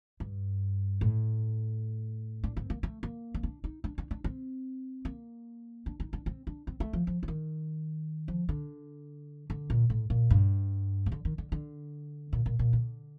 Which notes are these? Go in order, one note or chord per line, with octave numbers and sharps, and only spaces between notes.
G2
A2
D4
C4
A#3
A3
A#3
C4
D4
D#4
D4
D4
D4
C4
A#3
D4
D#4
D4
C4
D4
C4
A3
F3
F3
F3
D#3
F3
D3
D3
A#2
A2
A#2
G2
C3
D3
D#3
D3
D3
A#2
A#2
A#2
D3